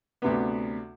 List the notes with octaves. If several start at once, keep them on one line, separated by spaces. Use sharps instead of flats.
D2 C3 B3